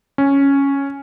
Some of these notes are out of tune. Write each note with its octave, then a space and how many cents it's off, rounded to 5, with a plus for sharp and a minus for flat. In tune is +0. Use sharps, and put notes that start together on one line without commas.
C#4 +0